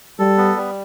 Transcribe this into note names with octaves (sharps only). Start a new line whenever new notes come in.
G3 A4
B3
G3